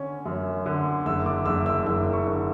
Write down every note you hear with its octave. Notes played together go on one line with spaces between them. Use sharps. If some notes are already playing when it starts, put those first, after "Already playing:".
Already playing: D3 C#4
F#2
D3
F#1 E6
D6
F#1 E6
E6
F#1 E6
C#6
D3